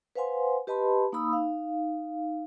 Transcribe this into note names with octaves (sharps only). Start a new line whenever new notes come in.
B4 C5 F5 F#5 G#5 C6
G4 B4 D#5 A5 B5 C6
A#3 D#4 F5 B5 D#6 E6
D#4 F5